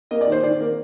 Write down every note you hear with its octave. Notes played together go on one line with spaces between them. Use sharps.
A#3 D#5
D5
D#3 C5
D#3 D5
A#3